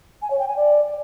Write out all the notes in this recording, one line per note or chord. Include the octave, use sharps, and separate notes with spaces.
G#5
C#5
G5
G#5
D5